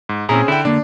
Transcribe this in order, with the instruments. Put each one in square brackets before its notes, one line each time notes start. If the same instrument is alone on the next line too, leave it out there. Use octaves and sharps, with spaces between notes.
[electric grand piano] G#2
[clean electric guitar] A#2 E4 A#5 [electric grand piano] C4 C#4 G#4
[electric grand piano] D3 G5 [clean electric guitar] E4
[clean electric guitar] D3 A#3 [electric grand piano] D4